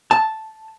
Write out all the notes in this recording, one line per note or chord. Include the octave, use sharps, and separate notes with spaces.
A5